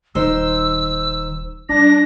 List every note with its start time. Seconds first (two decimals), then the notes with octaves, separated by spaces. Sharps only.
0.15 D#1 D#3 C5 E6
1.69 G3 D4 A#6